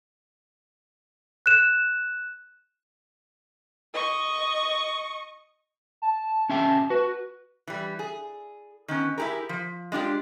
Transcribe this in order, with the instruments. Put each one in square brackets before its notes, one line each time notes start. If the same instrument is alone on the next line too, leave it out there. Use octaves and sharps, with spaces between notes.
[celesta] F#6 E7
[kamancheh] D#5 C#6
[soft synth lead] A5
[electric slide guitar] C#4 E5 G5
[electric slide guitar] F#4 [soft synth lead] B4
[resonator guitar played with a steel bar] E3 G3
G#4
D#3 B3 C#4
E4 F4 G4 G#4 A#4
F3
G#3 D4 F4 G4